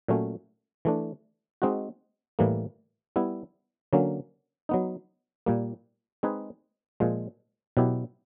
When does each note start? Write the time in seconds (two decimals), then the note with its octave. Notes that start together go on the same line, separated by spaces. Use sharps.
0.08 A#2 F#3 A3 C#4
0.85 E3 A3 D4
1.62 G#3 C4 D#4 F#4
2.39 A2 E3 G3 A#3
3.16 G3 B3 E4
3.93 D3 F#3 A#3 C#4
4.69 F#3 B3 D#4
5.46 A#2 G3 A#3
6.23 G#3 C4 D#4 G#4 B4
7.00 A#2 F3 G#3
7.77 B2 F#3 B3 E4 G4